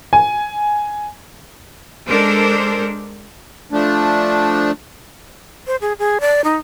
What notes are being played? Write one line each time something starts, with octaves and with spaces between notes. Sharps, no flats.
G#5
G#3 D4 A4 A#4 C5
F3 A3 D4
C5
G#4
G#4
D5
D#4